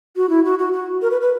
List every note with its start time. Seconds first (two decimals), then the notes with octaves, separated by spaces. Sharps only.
0.16 F#4
0.30 E4
0.45 F#4
0.59 F#4
0.73 F#4
1.02 A#4
1.11 B4
1.21 B4